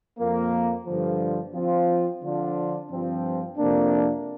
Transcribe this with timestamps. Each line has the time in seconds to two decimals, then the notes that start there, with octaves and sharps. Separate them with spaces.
0.19 F2 F3 A#3
0.86 G2 D3 F3
1.54 F3 C4 F4
2.23 D3 F3 D4 F4
2.90 G2 F3 C4
3.58 F2 C3 A#3 D4